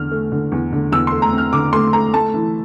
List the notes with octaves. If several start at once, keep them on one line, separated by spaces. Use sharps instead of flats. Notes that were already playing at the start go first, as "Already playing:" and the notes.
Already playing: E2 D3 F6
A3
D3
E2
D3
E2 E6
C6
A3
A#5
C4
F6
D3 D6
A3 C6
A3 A#5
A3 A5
E3